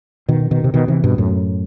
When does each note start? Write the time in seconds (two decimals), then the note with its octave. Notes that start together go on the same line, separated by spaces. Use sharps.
0.28 B2 D#3
0.51 B2 D#3
0.64 C3
0.74 B2 D#3
0.88 C3 E3
1.04 G2 B2
1.18 F#2 A2